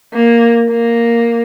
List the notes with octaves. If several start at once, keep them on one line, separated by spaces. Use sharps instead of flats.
A#3
A#3